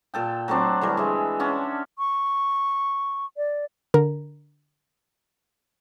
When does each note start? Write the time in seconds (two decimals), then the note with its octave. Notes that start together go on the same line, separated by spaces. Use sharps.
0.14 A#2 A4 G5
0.48 F#3 A3 C4 D4
0.81 D3 E3 G3
0.97 G#3 E5
1.39 C#4 D4 F#5
1.99 C#6
3.37 D5
3.94 D3 A#4